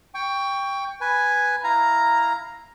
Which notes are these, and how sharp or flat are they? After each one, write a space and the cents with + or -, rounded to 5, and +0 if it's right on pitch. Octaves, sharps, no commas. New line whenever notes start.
G5 +15 C#6 +20
B4 +0 G#5 +0
E4 +0 F5 +0 A#5 +0